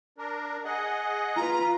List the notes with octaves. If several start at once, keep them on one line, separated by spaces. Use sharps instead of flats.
D4 A#4
G#4 D#5 F#5
F4 B4 A#5